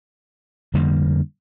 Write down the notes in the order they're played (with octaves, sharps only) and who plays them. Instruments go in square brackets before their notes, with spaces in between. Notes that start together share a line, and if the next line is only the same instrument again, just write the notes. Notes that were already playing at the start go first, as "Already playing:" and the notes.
[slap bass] F2 D3 G3 A#3